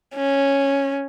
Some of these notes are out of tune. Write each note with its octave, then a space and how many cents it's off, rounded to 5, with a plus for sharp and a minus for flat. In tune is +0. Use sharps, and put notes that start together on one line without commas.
C#4 -5